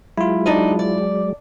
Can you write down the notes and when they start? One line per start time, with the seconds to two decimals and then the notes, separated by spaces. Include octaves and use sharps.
0.18 F#3 G#3 E4 F4
0.46 D4 D#4 D#5
0.79 D5